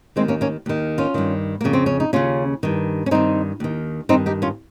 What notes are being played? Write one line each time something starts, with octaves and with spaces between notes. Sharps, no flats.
D#2 D#3 G#3 C4
A#3 C#4
A#3 C#4
D#2 D#3
C#4 F4
G2 D#3
F2 C#3 A#3
C4
C#4
D#4
D#2 C#3 C#4 F4
G2 D#3
C#4
G2 D#3 C4 D#4
D#2 D#3
G2 D#3 C4 D#4
D#4 G4
C#4 F4